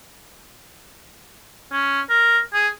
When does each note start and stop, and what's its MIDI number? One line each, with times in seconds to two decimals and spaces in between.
1.72 2.01 61
2.10 2.39 70
2.54 2.69 68